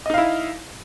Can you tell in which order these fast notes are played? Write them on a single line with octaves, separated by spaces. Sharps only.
D#5 D#4 F5 E4